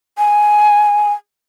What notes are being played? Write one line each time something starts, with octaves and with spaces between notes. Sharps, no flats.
G#5